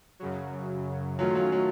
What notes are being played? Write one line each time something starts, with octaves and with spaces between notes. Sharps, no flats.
F#2 C#3 F#3
D#3 F#3 A3 C#4 F4
F#3
F#3